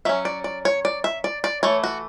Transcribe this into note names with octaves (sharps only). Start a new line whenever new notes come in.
F#3 C#4 E5
D5
D5
C#5
D5
E5
D5
D5
E3 A3 C#5
F#4